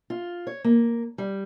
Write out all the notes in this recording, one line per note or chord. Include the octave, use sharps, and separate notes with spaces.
F4
C#5
A#3
G3